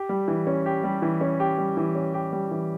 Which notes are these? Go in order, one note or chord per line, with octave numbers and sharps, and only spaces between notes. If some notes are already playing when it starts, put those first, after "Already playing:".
Already playing: G4
G3
E3
C#4
G4
G3
E3
C#4
G4
G3
E3
C#4
G4
G3
E3